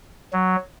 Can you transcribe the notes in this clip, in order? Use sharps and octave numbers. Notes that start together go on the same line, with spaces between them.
F#3